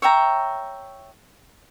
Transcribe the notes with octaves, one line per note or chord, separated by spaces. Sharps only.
C#5 E5 G5 A#5